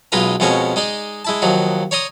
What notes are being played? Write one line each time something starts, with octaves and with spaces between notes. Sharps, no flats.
B1 G#3 D#4 F4 B4 A#5
F2 B2 G#3 C#4 A#4 C#6
G#3 D#4 D5
G#3 E4 A5
D#2 F3 F#3 D#4
C#5 D5 A#5 C6 D#6